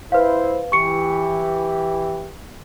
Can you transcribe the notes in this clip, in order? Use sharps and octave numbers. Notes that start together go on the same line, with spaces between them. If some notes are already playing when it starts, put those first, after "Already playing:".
E4 B4 C5 F5
E3 G4 C#6 C#7